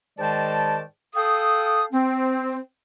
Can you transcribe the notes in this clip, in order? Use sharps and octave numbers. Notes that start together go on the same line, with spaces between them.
G#2 D#3 G#3 D5 G5 A5
A4 F5 G5 D#6
C4